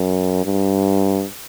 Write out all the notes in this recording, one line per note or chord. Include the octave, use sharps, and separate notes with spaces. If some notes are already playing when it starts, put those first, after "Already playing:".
Already playing: F#2
G2